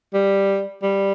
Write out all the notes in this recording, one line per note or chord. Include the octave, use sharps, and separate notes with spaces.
G3
G3